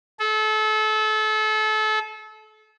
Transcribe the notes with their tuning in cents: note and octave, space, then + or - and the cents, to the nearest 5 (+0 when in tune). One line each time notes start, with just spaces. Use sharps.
A4 -30